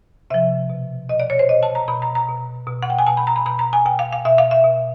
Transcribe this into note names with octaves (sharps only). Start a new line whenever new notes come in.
C3 F3 E5
B2
B2 D#5
D5
C#5
C5
B2 D#5
A5
A#5
B2 B5
A#5
A#5
B2
B2
F#5
G5
G#5
B2 A5
B5
A#5
B5
B2 B5
A#5
G#5
B2 G5
F5
F5
B2 E5
F5
E5
B2